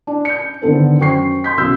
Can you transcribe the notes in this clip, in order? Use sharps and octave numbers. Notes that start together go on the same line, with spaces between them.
D4
G6 C#7
D3 D#3 B3 A4 C5
F#2 C5 G5 C#6 C7
C6 G6 B6
B1 C#3 E6 G6